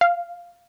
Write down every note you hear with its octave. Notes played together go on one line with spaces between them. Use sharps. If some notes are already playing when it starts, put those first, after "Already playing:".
F5